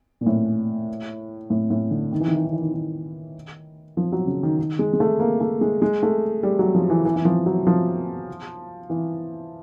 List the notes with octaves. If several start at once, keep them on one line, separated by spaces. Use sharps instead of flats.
A#2
A2
A2
A2
D3
D#3
E3
D#3
E3
D#3
E3
D#3
D#3
F3
F#3
C#3
D#3
D#3
G#3
G#3
A3
A#3
A3
G#3
G#3
A3
G3
F#3
F3
E3
E3
E3
F3
F#3
F3
E3